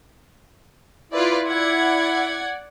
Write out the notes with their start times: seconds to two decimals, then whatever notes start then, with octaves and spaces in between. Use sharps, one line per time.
1.12 E4 F4 B4 D5
1.47 D5 F#5 G#6